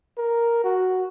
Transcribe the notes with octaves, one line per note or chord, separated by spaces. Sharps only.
A#4
F#4